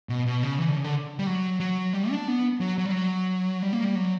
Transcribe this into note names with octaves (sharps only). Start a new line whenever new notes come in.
B2
B2
C#3
E3
D3
C#3
D3
G3
F#3
F#3
G3
D4
B3
F#3
F#3
G3
F#3
G3
A#3
G3
F#3